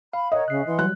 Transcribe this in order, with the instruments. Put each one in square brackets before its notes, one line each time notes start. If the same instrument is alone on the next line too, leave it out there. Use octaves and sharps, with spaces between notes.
[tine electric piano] F5 [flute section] B5
[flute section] A#4 C#5 F#5 [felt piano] D#5
[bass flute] C#3 [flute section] E5 [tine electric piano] F#6 C7
[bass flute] E3 [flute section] F#5 C6
[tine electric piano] F#3 G3 [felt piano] F#6